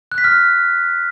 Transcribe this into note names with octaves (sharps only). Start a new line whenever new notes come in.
F#6
B6
F6